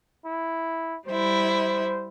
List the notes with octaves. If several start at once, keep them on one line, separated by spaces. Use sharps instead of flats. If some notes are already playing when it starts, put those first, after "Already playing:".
E4
G3 E4 C5